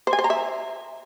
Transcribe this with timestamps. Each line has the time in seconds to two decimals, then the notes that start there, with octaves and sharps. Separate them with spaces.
0.07 C5
0.13 G#5
0.19 C5
0.24 A#5
0.30 E5